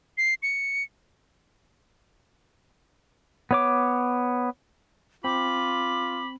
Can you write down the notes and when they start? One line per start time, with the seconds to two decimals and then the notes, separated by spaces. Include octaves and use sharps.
0.18 C7
0.43 C#7
3.51 B3 C#5 D6
5.24 C4 F4 B5 D6